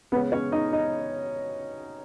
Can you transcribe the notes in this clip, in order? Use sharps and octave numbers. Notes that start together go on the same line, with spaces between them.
C#3 G#3 B3 C#4 B4
C#4 C#5
D#4 D#5
D#4 D#5